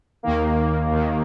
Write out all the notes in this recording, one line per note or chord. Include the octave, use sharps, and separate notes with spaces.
D#2 D#3 A#3
D#2 D#3